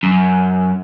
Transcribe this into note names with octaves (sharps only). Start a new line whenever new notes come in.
F#2